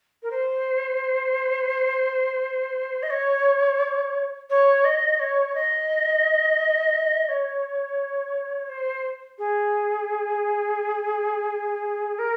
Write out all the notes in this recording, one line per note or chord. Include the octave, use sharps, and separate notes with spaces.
A#4
C5
D#5
C#5
C#5
D#5
C#5
D#5
C#5
C5
G#4
A#4